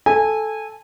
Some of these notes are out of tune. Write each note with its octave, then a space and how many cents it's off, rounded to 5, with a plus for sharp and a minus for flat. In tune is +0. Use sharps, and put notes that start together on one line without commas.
A4 -10 G#5 -20